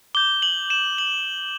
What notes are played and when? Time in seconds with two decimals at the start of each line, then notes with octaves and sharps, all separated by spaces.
0.15 D6 G6 G7
0.42 F#7
0.70 E7
0.98 F#7